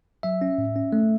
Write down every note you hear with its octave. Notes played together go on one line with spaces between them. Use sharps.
F#3 E5
C#4
A2
C#4
A3